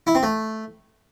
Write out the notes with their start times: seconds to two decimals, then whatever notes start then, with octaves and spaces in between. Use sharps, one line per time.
0.07 E4
0.15 C4
0.23 A3